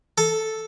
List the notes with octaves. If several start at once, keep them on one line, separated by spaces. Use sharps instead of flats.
A4